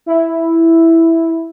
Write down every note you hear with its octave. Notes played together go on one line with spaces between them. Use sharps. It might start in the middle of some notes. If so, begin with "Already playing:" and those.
E4